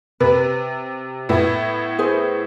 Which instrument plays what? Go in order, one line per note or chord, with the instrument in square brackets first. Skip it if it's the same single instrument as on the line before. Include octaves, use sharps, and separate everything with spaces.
[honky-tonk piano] C3 [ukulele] B4
[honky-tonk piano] A2 B3 E4
[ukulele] G#4 C5